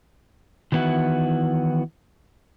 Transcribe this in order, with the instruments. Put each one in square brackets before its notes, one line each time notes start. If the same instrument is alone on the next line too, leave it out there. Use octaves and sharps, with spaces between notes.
[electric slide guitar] D#3 E3 B3 E4 F#4